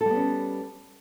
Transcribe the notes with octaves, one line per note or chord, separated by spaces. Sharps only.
G3 B3 C#4 A4